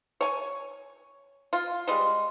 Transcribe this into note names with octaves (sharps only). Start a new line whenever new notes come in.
C#5 G#5
F4
G3 G#3